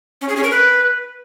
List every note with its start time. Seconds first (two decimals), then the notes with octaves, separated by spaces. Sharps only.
0.21 C#4
0.29 G#4
0.36 C#4
0.44 A#4
0.51 B4